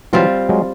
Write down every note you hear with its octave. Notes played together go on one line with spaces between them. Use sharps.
E3 F#3 G3 C4 F4
F#3 G#3